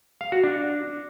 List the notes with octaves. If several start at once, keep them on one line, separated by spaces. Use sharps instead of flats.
F5
F#4
D4